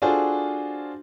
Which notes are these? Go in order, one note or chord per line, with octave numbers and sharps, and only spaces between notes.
D4 F4 F#4 G#4 A4 C5